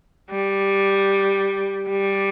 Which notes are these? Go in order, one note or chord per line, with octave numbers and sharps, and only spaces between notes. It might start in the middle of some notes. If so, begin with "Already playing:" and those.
G3
G3